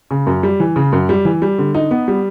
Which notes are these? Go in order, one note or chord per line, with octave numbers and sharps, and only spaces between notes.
C#3
F#2
G3
E3
C#3
F#2
G3
E3
G3
D3
D#4
B3
G3